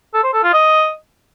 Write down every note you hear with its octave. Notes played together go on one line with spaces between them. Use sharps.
A4
C5
A4
F4
D#5